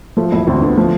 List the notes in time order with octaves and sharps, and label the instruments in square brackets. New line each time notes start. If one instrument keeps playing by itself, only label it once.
[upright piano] F3 [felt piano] A3
[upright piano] E1 [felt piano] E4
[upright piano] D2 [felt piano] C4
[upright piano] D3 [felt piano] B3
[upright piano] F3 [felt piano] A3